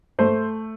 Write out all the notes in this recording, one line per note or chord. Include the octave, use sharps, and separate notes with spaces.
A3 C5